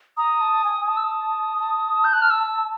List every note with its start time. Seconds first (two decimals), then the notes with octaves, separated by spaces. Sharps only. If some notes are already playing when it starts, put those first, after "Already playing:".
0.17 A#5 D#6
0.41 A5
0.64 G#5
0.81 G#5
0.88 A5 D#6
0.97 E6
1.04 D#6
1.59 A5
2.04 G6
2.13 F#6
2.22 F6
2.30 E6